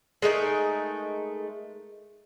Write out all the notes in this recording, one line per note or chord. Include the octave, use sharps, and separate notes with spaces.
G#3 A3 D#4 A#4